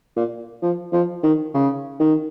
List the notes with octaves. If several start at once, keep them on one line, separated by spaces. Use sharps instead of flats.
A#2
F3
F3
D#3
C#3
D#3